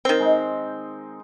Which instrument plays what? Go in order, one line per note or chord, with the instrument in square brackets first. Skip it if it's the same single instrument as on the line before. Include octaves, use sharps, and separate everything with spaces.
[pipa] D#3 C4
[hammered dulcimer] G#3 D#4